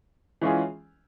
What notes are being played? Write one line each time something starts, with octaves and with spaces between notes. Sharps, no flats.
E3 G#3 C#4 F4 G#4